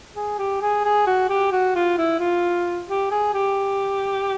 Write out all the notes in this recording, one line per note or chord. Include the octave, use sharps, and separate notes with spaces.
G#4
G4
G#4
G#4
F#4
G4
F#4
F4
E4
F4
G4
G#4
G4